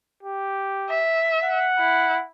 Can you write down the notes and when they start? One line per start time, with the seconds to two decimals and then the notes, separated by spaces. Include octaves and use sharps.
0.23 G4
0.90 E5
1.44 F#5
1.79 E4